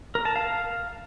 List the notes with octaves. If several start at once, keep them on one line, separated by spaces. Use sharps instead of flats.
A#4
A5
F5